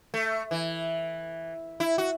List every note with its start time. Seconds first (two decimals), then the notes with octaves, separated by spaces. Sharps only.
0.14 A3
0.51 E3
1.80 E4
1.98 F#4